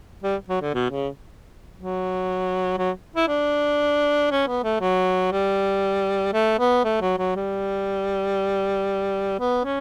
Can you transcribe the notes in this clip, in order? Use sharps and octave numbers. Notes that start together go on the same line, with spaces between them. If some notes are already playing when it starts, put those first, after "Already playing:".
G3
F#3
D3
B2
C#3
F#3
F#3
E4
D4
C#4
B3
A3
F#3
G3
A3
B3
A3
F#3
F#3
G3
B3
C#4